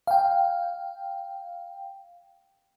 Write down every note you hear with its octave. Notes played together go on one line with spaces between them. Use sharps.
F5 G5